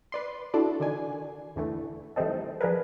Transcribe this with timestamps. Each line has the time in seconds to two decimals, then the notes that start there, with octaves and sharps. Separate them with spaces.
0.12 B4 D5 C6
0.54 D4 E4 F#4 A4 D5
0.80 D3 D#3 D4 G#5
1.56 E2 D3 E3 A3
2.16 E3 G3 A3 C4 D#4 A4
2.61 F3 D4 G#4 A#4 B4